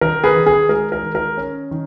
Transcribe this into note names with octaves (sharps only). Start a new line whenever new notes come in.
D#3 A#4
G#4 B4
D#3
G#4
G#3 A#4
A#4
D#3
A#4
C#4
D#3